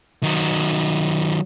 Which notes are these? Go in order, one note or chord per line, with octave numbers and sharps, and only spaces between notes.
D#3 F#3